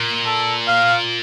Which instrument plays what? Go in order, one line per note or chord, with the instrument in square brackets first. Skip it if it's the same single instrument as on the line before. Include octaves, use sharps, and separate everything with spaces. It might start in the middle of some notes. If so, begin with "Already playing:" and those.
Already playing: [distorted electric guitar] A#2
[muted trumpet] A4
F5